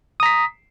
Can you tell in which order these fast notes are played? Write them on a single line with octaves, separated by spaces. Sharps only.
D#6 A#5 B6